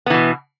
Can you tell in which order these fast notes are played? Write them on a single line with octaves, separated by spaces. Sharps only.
B3 E3 B2